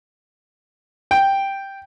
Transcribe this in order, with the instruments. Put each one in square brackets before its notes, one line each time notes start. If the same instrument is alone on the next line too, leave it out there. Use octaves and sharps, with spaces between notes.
[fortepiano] G5